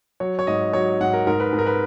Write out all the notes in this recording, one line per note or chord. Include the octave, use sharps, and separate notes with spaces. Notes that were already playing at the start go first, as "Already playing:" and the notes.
F#3 C#5
C#5
G#2 D#5
F#3 C#5
G#2 F#5
A#4
G#2 A#4
B4
G#2
A#4
B4